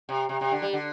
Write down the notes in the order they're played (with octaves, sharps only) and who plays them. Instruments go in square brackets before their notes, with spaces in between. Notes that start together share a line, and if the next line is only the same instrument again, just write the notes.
[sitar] C3
C3
C3
D3
G3
D3